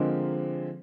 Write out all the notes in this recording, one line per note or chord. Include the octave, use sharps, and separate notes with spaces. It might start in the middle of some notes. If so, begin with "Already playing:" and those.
Already playing: D3 F3 G#3 C4 A#4